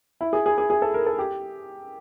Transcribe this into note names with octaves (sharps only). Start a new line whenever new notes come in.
E4
G#4
G#4
G#4
G#4
A4
A#4
A4
G4